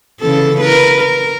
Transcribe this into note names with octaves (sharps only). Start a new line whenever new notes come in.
C#3 E3 A4
A#4 B4
A#4